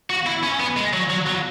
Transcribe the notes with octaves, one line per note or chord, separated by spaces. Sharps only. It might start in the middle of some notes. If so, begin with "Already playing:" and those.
F#4
E4
C#4
B3
G#3
F#3
F#3
F#3